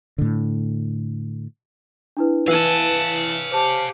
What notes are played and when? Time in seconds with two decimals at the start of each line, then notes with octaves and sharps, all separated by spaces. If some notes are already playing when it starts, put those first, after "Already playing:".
0.18 A2 D3
2.17 D4 E4 B4
2.48 E3 B4 F5 F#5 G#5 A5 E6
3.52 G4 C5 A5